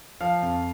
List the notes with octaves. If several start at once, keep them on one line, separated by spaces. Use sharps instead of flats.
F3 F5
F2